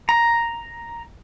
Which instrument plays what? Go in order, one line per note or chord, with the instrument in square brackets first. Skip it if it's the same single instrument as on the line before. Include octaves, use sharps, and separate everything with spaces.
[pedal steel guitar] A#5